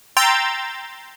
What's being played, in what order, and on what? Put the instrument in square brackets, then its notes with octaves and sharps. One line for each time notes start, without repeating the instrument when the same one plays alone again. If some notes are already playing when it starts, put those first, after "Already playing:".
[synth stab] G5 A#5 C6 E6 G6 A6